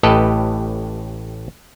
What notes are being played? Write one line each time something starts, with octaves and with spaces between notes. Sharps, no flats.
A1 A2 G4 A4 B4 D#5